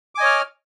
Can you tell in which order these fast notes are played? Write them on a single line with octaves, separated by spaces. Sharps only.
D6 G#5 D#5 C#5 F6